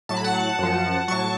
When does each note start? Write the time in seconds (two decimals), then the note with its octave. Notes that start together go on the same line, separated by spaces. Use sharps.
0.09 A2 F#3 A5
0.17 B5
0.24 F#5 A5
0.59 F#2 F3
1.08 A2 F#3 A5 C#6